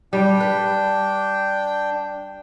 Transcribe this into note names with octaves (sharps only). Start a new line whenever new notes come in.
G3 D4 G5
B4